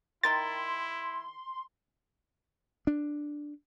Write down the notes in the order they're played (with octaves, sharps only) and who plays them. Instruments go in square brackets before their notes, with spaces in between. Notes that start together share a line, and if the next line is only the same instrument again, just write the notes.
[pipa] D#3 A#4 G5 [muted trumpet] E4 [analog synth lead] C6 [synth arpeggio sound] A6
[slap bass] D4